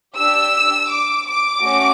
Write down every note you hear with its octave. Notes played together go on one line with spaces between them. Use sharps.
D4 G4 E6
D6
D6
A3 C#4 F#4